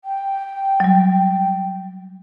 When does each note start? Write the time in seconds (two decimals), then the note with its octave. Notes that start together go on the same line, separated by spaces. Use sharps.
0.04 G5
0.80 F#3 G3